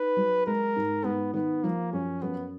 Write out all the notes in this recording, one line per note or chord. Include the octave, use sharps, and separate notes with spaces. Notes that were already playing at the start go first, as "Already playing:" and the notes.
Already playing: D#4 B4
F#3
G#3 A#4
G#2
G#2 B3
D#3 B3
F3 A#3
F#2 C#4
F#2 B3